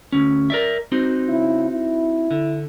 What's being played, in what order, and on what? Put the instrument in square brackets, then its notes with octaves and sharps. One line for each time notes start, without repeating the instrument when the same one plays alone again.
[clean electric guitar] D2 C#4
A#4 D5 E5
C4 D#4 F#4
[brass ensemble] C#3 E4
E4
[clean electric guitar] D3